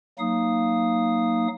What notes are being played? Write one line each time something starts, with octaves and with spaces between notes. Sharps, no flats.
F#3 A#3 D#4 F5 D#6